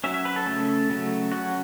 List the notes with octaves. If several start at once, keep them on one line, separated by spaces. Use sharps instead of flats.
F#3 C#4 E5
E5
B4
A4
C#3 A3 C#4
C#3 F#3 A3
F#3 C#4 F#4